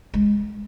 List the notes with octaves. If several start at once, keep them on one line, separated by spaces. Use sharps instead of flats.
G#3